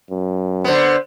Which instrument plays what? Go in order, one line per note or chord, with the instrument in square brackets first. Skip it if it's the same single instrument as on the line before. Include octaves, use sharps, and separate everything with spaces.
[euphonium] F#2
[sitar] D3 B3 [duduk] C5